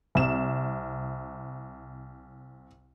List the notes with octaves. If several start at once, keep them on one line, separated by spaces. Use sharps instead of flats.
C2 E7